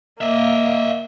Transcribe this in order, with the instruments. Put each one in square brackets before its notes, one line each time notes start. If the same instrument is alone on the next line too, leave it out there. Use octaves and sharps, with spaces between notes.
[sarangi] A#3 [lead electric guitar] D#5 E5